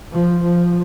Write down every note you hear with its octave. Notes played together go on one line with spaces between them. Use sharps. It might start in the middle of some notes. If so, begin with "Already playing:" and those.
F3
F3